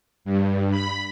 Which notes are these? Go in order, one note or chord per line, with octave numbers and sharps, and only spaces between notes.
G2
B5